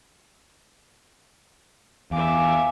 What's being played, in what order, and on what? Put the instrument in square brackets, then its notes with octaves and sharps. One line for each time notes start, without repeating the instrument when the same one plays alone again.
[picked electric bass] E2 [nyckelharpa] E5 D6 [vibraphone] F5 G#5